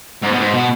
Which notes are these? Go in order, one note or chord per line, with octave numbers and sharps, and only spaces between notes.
G#2
B2
G#2
B2